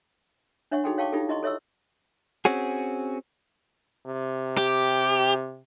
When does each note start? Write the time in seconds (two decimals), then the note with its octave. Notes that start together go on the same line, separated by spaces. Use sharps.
0.71 D4 C#5 E5 F#5 C#6
0.84 D#4 F#4 G#4 A4 G5 C6
0.98 C#5 F5 G5 A5 C#6 D6
1.12 D#4 F4 G4 A4
1.29 E4 D#5 C6 C#6
1.43 A4 C#5 E5 C#6 E6
2.45 C4 C#4 F#4 G#4
4.06 C3
4.57 G4